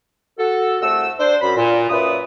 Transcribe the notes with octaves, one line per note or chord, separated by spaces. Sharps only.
F#4 A4
C2 A3 F#4 E6
D4 C5
F#2 B5
A#2
F#2 A#2 B4 D5 E5 D#6